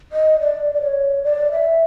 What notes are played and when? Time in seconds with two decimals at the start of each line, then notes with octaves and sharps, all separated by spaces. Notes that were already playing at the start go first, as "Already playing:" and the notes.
0.12 D#5
0.40 D5
0.74 D5
0.82 C#5
1.24 D5
1.52 E5